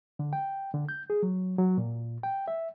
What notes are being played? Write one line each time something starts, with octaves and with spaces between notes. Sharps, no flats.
D3
G5
D3
G6
G#4
F#3
F#3
A#2
G5
E5